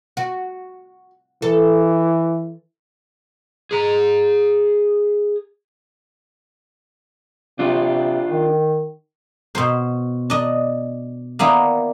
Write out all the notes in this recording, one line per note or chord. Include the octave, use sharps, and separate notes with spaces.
F#4
E3 A4
G#4 A#5
C3 D4 F4
D#3
B2 C5
D4 D#5
A#3 B3 D4 E4